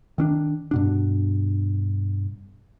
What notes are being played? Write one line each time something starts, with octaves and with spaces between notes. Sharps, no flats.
D#3 C#4 D4
G2 B2 D4